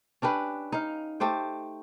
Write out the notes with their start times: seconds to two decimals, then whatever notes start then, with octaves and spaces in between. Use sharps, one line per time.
0.22 C#4 D4 G4 B4
0.72 D#4 F5
1.20 A3 G4 C5 G5